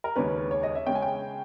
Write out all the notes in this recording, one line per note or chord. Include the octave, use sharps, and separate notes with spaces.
A#4
D#2 C#3 G#3 C#4 B4
C#5
D#5
E5
C#3 G#3 C#4 G5
G#5
G5